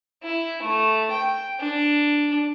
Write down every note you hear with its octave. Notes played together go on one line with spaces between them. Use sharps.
E4
A3
G5
D4